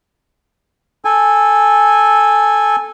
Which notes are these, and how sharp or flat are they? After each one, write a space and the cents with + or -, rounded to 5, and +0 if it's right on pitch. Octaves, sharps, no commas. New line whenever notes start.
A4 -10 G#5 -15